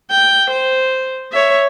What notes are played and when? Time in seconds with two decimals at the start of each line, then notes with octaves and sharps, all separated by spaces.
0.10 G5
0.50 C5
1.32 C#5 E5